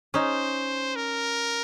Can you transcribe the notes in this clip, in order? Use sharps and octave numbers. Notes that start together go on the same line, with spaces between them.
C#4 D#4 C5
A#4